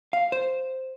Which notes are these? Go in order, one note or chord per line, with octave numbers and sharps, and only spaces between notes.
F5
C5